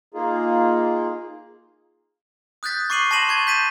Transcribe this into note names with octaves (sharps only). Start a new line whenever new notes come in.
A#3 D#4 F4 G#4
D#6 F#6 G6 A6 B6
C#6 D6 C7 D#7 F#7
A5 C6 A#6 D#7 E7 F#7
C#6 G#6 A6
G6 B6 D#7 E7